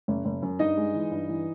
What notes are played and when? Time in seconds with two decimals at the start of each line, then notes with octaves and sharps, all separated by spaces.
0.08 F#1
0.25 F#1
0.42 F#2
0.59 G2 D#4 D#5
0.77 G#3
0.94 E3
1.11 G2
1.29 E3